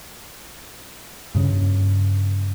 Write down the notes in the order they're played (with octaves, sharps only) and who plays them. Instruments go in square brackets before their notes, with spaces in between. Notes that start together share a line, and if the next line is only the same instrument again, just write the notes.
[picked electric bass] G2 C#3